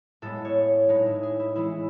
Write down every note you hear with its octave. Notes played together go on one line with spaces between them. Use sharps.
A2 G#3 B3 A4
C#5
A2 G#3 B3 D#4
E4
G#4
E4
E3 G#3 C#4 E4